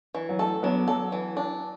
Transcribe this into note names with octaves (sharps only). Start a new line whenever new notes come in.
E3
F#3
A3 A4
F#3 B3 D4
F#3 A4
E3
D4